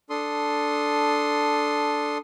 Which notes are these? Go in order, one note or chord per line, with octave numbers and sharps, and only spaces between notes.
D4 A4 C6 D#6